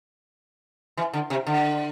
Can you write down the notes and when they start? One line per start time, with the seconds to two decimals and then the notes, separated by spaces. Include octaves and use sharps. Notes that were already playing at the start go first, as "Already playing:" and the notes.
0.97 E3
1.13 D3
1.30 C3
1.47 D3